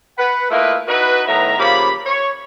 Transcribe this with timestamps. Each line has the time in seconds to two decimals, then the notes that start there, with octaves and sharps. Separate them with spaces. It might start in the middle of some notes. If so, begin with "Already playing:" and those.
0.18 B4 F#5
0.50 A3 A#3 E4 F4 B4 D#5
0.88 D#4 E4 F#4 B4
1.28 A2 D#3 B3 E5 A#5
1.59 C#3 F3 A#3 G4 B5
2.06 C#5